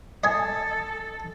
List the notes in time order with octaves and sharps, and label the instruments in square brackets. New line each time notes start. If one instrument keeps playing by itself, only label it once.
[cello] A4 [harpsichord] D#5 G#5